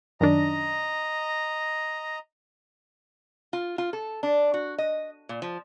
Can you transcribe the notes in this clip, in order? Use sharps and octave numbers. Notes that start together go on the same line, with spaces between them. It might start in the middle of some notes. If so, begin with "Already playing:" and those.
F#2 D#3 D4 D#5 A#5
F4
F4
A4
D4
F#4
D#5
A#2
F3